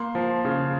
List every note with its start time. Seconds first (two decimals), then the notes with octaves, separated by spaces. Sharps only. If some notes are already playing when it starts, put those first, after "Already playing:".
Already playing: A#3 C6
0.15 F3
0.45 C#3